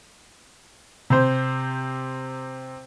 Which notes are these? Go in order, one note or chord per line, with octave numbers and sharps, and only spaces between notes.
C3 C5